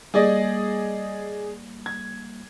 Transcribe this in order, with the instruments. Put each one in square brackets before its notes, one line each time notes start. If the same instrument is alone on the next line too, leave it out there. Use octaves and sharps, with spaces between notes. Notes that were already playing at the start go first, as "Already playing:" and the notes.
[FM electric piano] G3 A#3 [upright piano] G#4 D5 D#5
[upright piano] G#6